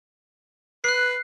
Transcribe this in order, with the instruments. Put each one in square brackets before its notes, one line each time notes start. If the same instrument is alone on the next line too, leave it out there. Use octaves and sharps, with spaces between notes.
[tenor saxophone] B4 [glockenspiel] F#6 C7